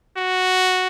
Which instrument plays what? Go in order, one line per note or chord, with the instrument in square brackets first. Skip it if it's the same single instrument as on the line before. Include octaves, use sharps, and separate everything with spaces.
[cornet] F#4